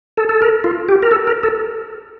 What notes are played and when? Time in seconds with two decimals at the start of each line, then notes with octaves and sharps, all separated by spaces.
0.17 A4
0.29 A4
0.42 A#4
0.64 F4
0.89 G4
1.02 A#4
1.11 A4
1.27 A#4
1.43 A4